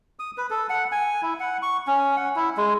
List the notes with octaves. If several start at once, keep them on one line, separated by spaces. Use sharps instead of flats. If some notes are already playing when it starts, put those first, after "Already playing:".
D#6
B4
A4
F#5
G#5
E4
F#5
C#6
C#4
F#5
E4
G#3